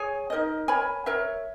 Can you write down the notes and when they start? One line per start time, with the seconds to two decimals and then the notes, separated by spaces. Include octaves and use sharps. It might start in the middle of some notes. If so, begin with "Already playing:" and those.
Already playing: G#4 C#5 G#5
0.30 D#4 A#4 D#5
0.68 A#4 C#5 G#5 B5
1.06 A#4 C#5 E5